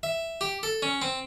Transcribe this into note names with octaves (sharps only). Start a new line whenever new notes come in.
E5
G4
A4
C#4
C4